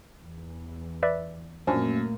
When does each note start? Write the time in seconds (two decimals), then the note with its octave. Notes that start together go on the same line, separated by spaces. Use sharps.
0.22 E2
1.03 B4 D5 E5
1.67 F#2 A#2 F3 A3 A#3 C#4 D4